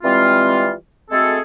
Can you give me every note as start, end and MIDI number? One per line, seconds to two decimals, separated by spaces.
0.04 0.72 52
0.04 0.72 55
0.04 0.72 56
0.04 0.72 60
0.04 0.72 65
1.11 1.39 56
1.11 1.39 57
1.11 1.39 60
1.11 1.39 66
1.11 1.39 68
1.11 1.39 69